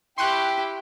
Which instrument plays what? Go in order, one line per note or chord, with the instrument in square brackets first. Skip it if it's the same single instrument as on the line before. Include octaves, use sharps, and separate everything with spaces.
[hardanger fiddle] E4 G4 [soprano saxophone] G5 [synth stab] C6 C#6 F#6